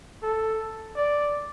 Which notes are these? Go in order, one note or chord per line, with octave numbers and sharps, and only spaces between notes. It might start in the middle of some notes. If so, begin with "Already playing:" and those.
A4
D5